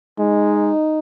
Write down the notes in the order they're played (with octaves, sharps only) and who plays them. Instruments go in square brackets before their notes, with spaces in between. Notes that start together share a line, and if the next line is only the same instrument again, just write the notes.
[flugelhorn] G#3 [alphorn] D#4